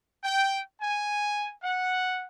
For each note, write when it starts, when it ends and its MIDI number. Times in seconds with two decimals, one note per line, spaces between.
0.24 0.60 79
0.81 1.51 80
1.62 2.26 78